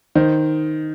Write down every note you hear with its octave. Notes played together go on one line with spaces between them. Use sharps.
D#3 C5